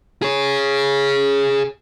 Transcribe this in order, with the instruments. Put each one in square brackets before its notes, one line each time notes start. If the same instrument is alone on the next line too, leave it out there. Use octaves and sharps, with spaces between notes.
[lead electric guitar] G#4 C#5